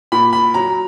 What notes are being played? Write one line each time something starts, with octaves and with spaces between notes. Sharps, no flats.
A#2 B5
B5
F#3 A#5